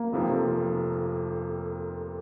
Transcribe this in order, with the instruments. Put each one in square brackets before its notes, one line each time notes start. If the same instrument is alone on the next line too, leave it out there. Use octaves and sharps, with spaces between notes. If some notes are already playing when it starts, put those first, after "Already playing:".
Already playing: [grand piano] A#3
[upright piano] F1 F2 C3 F3